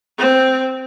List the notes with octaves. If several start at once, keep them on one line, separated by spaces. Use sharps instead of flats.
C4